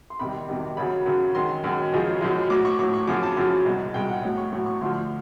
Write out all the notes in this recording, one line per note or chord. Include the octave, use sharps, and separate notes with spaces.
C6
E2 C3 D#3 G3 B5
E2 C3 D#3 G3
F#2 C#3 F#3 B5
F#2 C#3 F#3
F#2 D#3 G#3 C6
F#2 D#3 G#3
F#2 C#3 F3 G#3
F#2 C#3 F3 G#3
A2 F#3 D6
C#6
A2 F#3 D6
C#6
F#2 C#3 F3 D6
A5
F#2 C#3 F3
C2 B2 G#3
C2 B2 G#3 G5
F#5
A2 F#3
C#6
A2 F#3 C#6
C#6
D2 D3 F3 C6